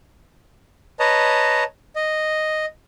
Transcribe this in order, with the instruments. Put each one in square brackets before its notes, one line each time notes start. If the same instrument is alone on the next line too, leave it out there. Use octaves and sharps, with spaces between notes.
[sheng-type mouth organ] B4 C#5 D#5 A5 A#5
D#5